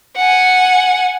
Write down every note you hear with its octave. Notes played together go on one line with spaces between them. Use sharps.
F#5 G#5